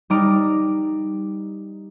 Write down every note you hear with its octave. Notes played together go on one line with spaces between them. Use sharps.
G3 D#4 A#5 D6 F6 D7